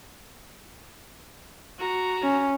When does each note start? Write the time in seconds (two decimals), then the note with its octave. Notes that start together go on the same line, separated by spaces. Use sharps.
1.79 F#4 A#5
2.23 C#4